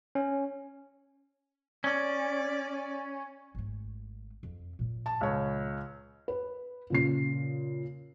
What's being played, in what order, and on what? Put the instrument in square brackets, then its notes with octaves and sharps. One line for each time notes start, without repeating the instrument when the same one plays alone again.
[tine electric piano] C#4
[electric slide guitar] C#4 [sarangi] D5
[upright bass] G#1 A3
F2
A#2 F3
[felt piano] A5
C#2 C#5
B4
A#2 C#3 C7